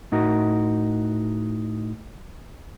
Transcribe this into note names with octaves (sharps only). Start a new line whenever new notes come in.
A2 D#4 F#4 A#4